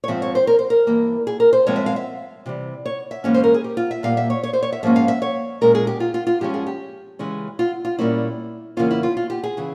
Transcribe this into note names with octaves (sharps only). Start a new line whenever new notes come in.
C#5
G#2 F3 C4 E5
C#5
C5
A#4
C5
A#4
G2 E3 A#3
G#4
A#4
C5
G2 F3 G#3 C4 C#5
E5
F5
E5
C3 E3 G3
C#5
E5
G#2 E3 A#3 C#4 C#5
C5
A#4
G#4
G4
F4
E5
A#2 G3 A#3 F5
E5
C#5
C#5
C5
C#5
E5
G#2 F3 A#3 C#4 E5
F5
E5
C#5
A#2 G#3 C#4 A#4
G#4
G4
F4
F4
F4
G2 F3 G#3 C#4 G4
G#4
G4
C#3 E3 G#3 C#4
F4
F4
A#2 G3 A#3 C#4 E4
E2 C#3 E3 A#3 C#4 F4
E4
F4
F4
G4
G#4
C#3 E3